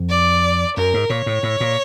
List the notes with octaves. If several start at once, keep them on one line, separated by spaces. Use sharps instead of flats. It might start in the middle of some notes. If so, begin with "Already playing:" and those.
Already playing: F2
D5
F#2 A#4
G#2
A#2 C#5
A2
A2
A#2